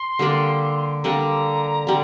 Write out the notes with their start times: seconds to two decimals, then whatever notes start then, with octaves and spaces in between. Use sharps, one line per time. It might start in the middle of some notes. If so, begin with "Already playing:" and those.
Already playing: C6
0.19 D3 G3 A#3 D4
1.04 D3 G3 A#3 D4 A#5
1.87 D3 G3